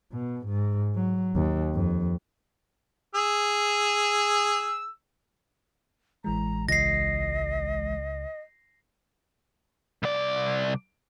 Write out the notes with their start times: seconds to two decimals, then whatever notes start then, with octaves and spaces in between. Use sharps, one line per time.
0.12 B2
0.46 G#2
0.95 F#3
1.36 D#2
1.75 F2
3.15 G#4 E6
6.24 A1 E3 G#3 A#5
6.69 C#2 D#5 A#6 C7
10.03 C2 D5